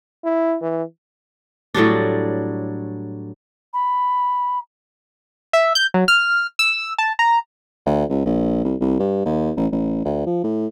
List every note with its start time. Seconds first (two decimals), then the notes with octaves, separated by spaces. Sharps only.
0.24 E4
0.62 E3
1.74 A2 F#3 G3 D4
3.74 B5
5.53 E5
5.75 G6
5.94 F#3
6.08 F6
6.59 E6
6.98 A5
7.19 A#5
7.86 D2
8.09 C#2
8.25 A#1
8.64 C2
8.80 C2
8.99 G2
9.25 D#2
9.57 A1
9.72 A1
10.05 D2
10.26 F3
10.44 A2